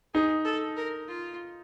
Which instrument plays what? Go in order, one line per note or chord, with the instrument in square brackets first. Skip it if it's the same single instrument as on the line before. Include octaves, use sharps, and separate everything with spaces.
[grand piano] D#4 [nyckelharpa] G#4
[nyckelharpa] A4
A#4
F4